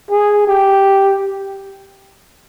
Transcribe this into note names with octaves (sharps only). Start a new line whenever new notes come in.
G#4
G4